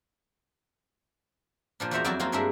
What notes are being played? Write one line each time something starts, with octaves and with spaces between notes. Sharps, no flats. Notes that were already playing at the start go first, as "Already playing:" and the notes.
A#2 F3 D4
E2 F#4 C5 E5 F#5 A#5
F2 F#3 E4 F#4 D5 A5
F#3 A#3 C4 D#4 F4
G2 G#3 D4 A#4 E5